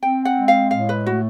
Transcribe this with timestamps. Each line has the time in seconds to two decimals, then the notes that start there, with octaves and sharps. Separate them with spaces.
0.03 C4 G5
0.25 F#5
0.37 G#3
0.48 F5
0.71 A2 F5
0.89 B4
1.05 A3 F#4